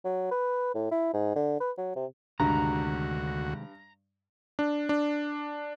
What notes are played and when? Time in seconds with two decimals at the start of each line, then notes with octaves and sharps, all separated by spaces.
0.05 F#3
0.31 B4
0.75 A2
0.91 E4
1.14 G#2
1.36 D3
1.60 B4
1.78 F#3
1.96 C3
2.40 D2 G2 C3 D#3 G#3 F#4 A#5
4.59 D4
4.89 D4